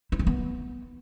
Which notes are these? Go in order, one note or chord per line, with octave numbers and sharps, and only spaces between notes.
E4
D#3
B3